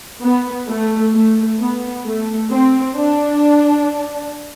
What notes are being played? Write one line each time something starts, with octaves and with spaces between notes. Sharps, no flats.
B3
A3
A3
B3
A3
C4
D4